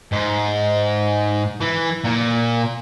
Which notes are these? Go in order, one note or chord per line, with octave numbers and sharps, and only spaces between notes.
G#2
E3
A#2